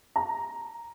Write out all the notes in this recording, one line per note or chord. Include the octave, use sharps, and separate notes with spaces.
A#5